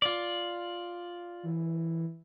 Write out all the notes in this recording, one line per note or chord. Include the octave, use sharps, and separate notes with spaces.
F4 D5
E3